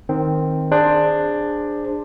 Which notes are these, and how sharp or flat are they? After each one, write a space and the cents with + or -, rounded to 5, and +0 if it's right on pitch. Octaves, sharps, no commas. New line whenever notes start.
D#3 +0 C4 +0
D4 +10 G#4 -10 C5 +5